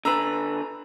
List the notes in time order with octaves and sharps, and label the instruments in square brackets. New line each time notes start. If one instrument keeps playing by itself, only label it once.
[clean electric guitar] D3 B4 [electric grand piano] A#5 E6